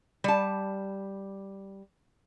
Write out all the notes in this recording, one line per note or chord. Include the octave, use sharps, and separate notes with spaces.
G3 A5